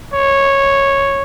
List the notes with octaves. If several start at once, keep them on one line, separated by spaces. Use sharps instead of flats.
C#5